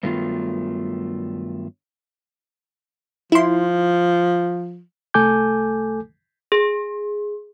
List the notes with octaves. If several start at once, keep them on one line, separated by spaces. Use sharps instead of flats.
G2 D#3 F#3 A3 B3 F4
F3 E4 C6
C2 A3 A4 G#5 D6 G6
G#4